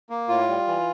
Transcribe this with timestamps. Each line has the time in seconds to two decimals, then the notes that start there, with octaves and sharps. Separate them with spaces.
0.10 A#3
0.28 A2 F4
0.48 G3
0.67 E3